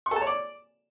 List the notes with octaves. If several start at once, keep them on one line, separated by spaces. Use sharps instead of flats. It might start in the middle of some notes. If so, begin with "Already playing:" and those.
C#6
A4
A5
C#5
D5